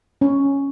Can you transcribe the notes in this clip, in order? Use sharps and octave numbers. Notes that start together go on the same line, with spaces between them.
C#4